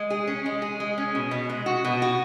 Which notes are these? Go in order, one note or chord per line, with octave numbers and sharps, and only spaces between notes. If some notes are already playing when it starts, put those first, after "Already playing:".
Already playing: G#3
G#4
C#4
G#3
G#4
G#3
C#4
B2
B2
G#3
F#4
B2
F#4